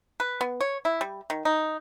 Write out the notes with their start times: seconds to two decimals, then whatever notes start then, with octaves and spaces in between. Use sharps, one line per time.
0.20 B4
0.41 B3
0.61 C#5
0.85 E4
1.01 G3
1.30 D#3
1.45 D#4